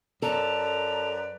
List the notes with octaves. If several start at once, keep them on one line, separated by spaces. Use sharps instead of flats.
F#2 A4 B4 D5 A#5